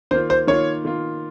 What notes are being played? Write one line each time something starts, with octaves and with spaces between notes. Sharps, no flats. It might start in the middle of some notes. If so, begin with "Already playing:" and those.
D#3 A#3 F4 C5
C5
D#3 A#3 F4 C#5
D#3 A#3 F4